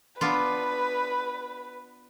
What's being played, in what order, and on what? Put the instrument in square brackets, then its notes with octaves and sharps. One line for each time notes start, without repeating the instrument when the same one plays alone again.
[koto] B3 D4 F4 [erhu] B4